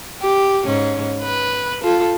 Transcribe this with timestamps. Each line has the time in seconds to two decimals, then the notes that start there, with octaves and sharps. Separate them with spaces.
0.22 G4
0.65 G#2 C#4
1.22 B4
1.83 F4 A4